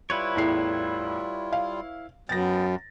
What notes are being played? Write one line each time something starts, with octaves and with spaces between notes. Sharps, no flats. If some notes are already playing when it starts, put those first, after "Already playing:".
G3 E4 F4 B4 C#5
E2 A2 C7
F5
F#2 B3 G5 A6 A#6